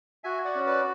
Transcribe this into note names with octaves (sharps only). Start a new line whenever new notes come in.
F#4 E5 G#5
D5 F#5
C#4
B4 D5